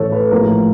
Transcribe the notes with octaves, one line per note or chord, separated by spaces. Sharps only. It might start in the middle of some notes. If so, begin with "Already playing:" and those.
Already playing: A1 A2 E3 A4 C#5
B4
A#1 A2 F3 A#4